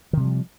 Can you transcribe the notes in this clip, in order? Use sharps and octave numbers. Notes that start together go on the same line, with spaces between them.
C3 D#3 F3 G3